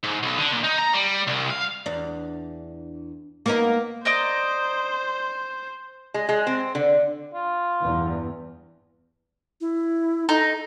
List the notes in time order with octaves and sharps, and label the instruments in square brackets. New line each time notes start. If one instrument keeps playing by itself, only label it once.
[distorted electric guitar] G#2
B1
D3
A#2
D#4
A#5
G3
C2
F5
[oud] E2 D4
A#3 B3 D#4
[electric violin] C5 [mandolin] D5 D#5 A#5
[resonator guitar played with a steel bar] G#3
G#3
C4
D3
[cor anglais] F4
[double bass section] E2 G2
[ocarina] E4
[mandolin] D#4 [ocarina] A4